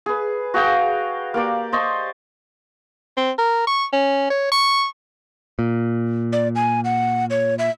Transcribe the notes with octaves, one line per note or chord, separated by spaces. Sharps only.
G#4 B4
F#4 G#4 F5 G5
A#3 G4 D5
C5 D#5 A5 C#6
C4
A#4
C#6
C#4
C#5
C#6
A#2
D5
G#5
F#5
C#5
E5